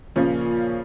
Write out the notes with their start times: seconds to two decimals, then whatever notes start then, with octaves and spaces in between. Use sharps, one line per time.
0.16 A#2 C#3 F3 C#4